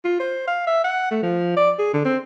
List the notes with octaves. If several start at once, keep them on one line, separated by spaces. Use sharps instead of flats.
F4
C5
F5
E5
F#5
A3
F3
D5
G#4
D3
C4